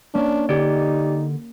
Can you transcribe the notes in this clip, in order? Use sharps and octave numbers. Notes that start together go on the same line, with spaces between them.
A#3 C#4 D4
D3 D#4 G4 D5 D7